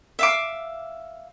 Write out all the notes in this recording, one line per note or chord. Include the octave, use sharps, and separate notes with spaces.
E5 F5 D6